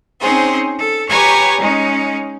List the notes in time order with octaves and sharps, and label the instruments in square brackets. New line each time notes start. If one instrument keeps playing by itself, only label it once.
[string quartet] C4 C#4 D#4 G#4 C5
A4
G4 B4 C#5 G#5 A#5 C#6
G#3 C#4 D#4